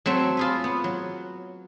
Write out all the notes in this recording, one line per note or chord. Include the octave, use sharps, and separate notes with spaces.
F#3 A3 C4 E5
F4 G#4 B4
B3
F#3